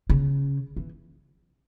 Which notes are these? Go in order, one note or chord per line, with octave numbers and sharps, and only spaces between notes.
C#3
E3